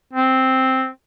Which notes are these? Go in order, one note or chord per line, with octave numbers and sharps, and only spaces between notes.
C4